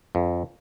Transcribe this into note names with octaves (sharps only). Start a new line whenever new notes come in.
F2